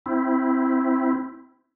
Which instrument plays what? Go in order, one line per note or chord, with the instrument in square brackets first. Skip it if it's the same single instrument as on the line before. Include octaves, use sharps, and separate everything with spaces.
[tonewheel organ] C4 E4